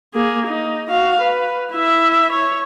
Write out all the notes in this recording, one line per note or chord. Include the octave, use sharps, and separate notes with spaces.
A#3 G#4
D#4
F#4 F5
B4
E4 E5
C#5